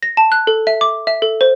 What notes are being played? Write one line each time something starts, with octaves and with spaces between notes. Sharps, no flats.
A#6
A5
F#6
A4
E5
D6
E5
A4
C5